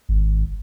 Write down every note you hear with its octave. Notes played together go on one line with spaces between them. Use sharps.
G#1